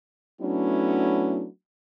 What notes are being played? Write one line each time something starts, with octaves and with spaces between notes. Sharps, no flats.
F#3 A3 B3 C#4 D4 E4